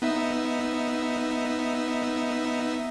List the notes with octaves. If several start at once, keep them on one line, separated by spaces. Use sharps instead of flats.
B3 D#4 E5